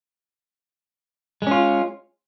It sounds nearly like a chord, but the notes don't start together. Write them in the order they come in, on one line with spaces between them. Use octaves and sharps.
G#3 C#4 F4